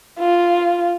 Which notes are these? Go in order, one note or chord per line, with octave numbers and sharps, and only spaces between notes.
F4